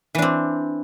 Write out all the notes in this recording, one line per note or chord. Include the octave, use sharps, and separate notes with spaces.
E3 C4 D4